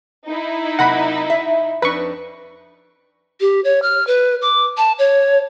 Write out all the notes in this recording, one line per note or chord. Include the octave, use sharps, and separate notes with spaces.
D#4 E4
C3 F#3 A#3 F#5 B5
E5
F2 D4 D#4 B4 C#6
G4
C#5
F6
B4
D6
A5
C#5